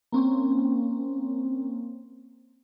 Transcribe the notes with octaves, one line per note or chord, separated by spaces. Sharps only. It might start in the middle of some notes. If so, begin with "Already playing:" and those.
A#3 C4 C#4